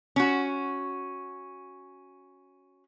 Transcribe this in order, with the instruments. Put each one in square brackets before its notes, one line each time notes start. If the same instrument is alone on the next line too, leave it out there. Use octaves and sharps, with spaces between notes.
[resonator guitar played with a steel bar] C#4 F#4